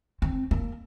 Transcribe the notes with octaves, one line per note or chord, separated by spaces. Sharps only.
C4
A#3